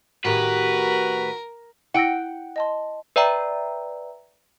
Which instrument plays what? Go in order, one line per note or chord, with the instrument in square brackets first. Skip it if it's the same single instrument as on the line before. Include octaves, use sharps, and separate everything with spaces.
[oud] A2 D#3 G4 [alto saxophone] F#4 [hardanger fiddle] A#4 [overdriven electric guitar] B4
[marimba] E4 E6 A#6 [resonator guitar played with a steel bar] F#5 G5
[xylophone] D#5 A5 C6
[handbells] B4 D5 E5 G5 A#5